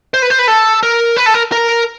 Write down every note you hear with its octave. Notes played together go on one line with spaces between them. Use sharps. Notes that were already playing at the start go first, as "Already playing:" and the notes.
C5
B4
C5
B4
A4
A#4
B4
A4
A#4
A#4